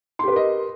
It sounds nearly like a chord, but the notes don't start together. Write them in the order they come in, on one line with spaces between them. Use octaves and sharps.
C6 G4 B4 A#4 D#5